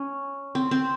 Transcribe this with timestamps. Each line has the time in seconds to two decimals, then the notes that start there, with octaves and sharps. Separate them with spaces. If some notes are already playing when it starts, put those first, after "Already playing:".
Already playing: C#4
0.55 C4
0.71 C4